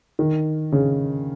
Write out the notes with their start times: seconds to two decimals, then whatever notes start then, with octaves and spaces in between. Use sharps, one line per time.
0.19 D#3
0.72 C#3